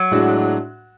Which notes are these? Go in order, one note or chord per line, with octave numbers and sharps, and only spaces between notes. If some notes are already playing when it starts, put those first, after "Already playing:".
Already playing: F#3
A2 G#3 D4 F#4